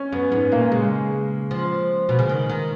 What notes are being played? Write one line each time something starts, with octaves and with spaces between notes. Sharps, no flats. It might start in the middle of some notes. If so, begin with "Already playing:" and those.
Already playing: C#4
F#2 B3
G#2 B3
A#2 A#3
C#3 G#3
F3
B2
C#3
D#3
D#3